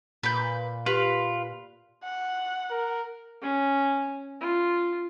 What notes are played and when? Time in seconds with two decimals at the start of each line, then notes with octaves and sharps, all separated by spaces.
0.23 A#2 A4 B4 A#5 G6
0.86 F4 G4 B4
2.04 F#5
2.71 A#4
3.42 C#4
4.40 F4